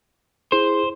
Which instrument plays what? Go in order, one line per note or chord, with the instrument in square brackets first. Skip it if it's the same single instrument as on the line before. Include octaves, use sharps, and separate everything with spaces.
[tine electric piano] E4 G#4 [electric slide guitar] C5